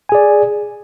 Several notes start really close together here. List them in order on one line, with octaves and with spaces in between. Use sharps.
G#5 G#4 D5